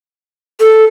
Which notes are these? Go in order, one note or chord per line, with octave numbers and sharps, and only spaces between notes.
A4